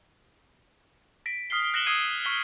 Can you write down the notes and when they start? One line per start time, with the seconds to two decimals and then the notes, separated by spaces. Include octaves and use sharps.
1.26 A#6 B6 D7
1.50 D#6 F6 B6 C7 G7
1.74 F#6 A#6 C#7 E7 F#7 G7
1.86 D#6 E6 F#6 G#6 C7 D#7
2.25 C#6 F6 B6 G7